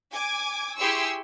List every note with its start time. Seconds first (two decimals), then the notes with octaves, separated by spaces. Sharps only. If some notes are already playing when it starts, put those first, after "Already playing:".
0.11 G#5 D6 G#6
0.77 E4 G4 G#4 C6 C#6 E6